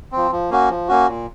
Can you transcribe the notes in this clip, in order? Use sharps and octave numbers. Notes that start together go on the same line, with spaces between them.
F3 C4
F3
A#3 C#4 F#4
F3
A#3 C#4 F#4
A#2